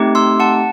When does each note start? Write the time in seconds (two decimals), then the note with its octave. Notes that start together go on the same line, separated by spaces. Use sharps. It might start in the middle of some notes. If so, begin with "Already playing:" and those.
Already playing: A3 C4 D#4 G4
0.15 C6 E6
0.40 F#5 A5